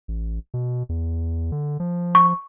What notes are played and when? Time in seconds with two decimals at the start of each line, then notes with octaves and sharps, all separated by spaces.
0.08 A1
0.54 B2
0.89 E2
1.52 D3
1.80 F3
2.15 C#6